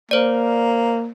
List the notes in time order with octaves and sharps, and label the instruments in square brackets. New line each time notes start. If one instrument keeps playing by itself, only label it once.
[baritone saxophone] A#3 [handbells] C5 D5